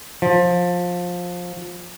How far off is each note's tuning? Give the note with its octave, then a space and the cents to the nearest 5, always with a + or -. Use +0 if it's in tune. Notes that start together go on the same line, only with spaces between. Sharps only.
F3 +20